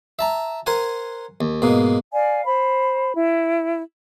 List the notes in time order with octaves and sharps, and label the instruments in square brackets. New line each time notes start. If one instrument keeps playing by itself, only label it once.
[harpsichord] E5 A5 A#5
A#4 C5 F#5 G#5
D#2
G#2 B2 A#3
[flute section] D5 F5 G#5
C5 B5
E4